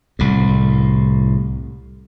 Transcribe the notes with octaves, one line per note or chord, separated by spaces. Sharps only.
C2 A2